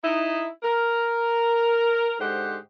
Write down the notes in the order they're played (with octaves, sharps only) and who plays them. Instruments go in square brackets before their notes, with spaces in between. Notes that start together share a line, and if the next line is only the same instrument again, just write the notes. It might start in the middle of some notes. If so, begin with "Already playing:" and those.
[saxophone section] D#4 E4
A#4
G#2 D3 G#3 G4 C5 F#5